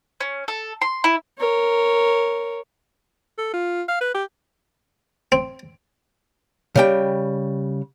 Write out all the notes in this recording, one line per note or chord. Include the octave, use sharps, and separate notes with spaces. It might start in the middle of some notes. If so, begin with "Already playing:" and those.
C#4
A4
C6
E4
A#4 C#5
A4
F4
F5
B4
G4
C4
C#3 G3 G5